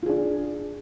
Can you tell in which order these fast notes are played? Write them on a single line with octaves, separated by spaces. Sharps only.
F4 G#4 D4